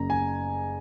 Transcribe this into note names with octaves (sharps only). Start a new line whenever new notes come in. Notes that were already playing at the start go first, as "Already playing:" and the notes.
Already playing: F#1 F#2 C#3 A#5
G#5